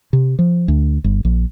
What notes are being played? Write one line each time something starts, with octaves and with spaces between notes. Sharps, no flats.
C3
F3
D2
G1
A#1